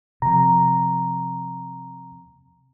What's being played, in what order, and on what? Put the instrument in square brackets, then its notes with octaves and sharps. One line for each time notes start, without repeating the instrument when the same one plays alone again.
[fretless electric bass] C3 F3 [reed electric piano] A#5